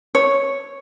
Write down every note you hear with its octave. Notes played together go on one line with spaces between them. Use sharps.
C#5